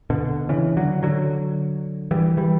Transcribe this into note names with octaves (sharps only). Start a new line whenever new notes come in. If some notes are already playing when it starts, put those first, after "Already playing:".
B2 D3
C#3 E3
D3 F#3
D3 F#3
E3 G3
E3 G3